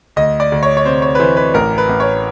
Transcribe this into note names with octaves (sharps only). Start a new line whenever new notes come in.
D2 D#5
D5
D2
C#5
C#5
C3 C5
C#5
B4
E3 C5
B4
A1 A#4
B4
A1
C#5